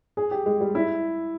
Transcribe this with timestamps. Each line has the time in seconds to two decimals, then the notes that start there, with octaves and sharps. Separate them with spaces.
0.17 G#4
0.31 G4
0.46 G#3
0.61 G3
0.75 E4